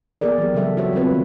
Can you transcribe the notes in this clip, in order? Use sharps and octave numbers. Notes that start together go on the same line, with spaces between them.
A#3 B3 G#4 A#4 D5
E3 F#3 G4
C#3 F#3 G3 A4 E5
F#3 F#4 G4 C5 C#5 E5
G3 B3 C4 F4 B4
D#3 G3